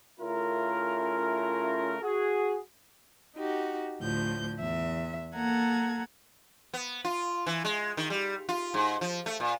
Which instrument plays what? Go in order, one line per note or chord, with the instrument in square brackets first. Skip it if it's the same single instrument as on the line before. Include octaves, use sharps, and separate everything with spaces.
[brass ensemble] C#3 A3 C#4 E4 F4 A#4
F#4 G#4
[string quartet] D#4 F#4 G4
D2 A2 F3 G6
E2 E5
A#3 A4 F#5 A#5 G#6
[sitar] B3
F4
E3
G#3
D#3
G3
F4
G#2
F3
A3
A#2